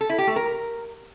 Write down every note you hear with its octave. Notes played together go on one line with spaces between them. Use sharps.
A4
E4
G4
A3
A#4